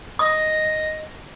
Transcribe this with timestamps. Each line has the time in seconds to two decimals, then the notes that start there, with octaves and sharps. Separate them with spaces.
0.19 D#5 D#6